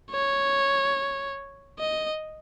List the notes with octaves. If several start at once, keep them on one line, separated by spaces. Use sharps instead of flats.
C#5
D#5